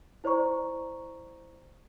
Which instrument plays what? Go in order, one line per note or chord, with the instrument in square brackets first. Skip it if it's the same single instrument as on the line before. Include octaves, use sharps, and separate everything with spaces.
[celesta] E4 C5 D5 A#5 C#6